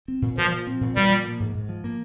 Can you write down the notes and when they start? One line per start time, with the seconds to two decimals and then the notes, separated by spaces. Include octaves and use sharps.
0.08 C4
0.22 A#2
0.37 A#2 F3
0.51 F3
0.67 C4
0.81 A#2
0.96 A#2 G3
1.10 F3
1.25 A#3
1.40 G#2
1.55 G#2
1.69 F3
1.84 A#3